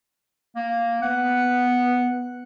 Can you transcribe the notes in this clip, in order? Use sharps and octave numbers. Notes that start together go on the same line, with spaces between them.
A#3
B3 F#5